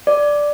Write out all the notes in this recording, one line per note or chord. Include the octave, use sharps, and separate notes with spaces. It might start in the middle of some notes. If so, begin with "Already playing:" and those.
D5